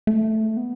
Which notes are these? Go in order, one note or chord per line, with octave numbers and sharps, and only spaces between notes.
A3
B3